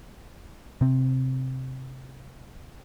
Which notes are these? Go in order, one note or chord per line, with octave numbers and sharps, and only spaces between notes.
C3 C4